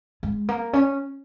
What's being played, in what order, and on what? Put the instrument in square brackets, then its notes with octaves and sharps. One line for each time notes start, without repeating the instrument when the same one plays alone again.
[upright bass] G#3
A#3
C#4